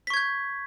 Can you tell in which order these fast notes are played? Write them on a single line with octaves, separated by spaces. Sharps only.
B6 C#6 G#6 G6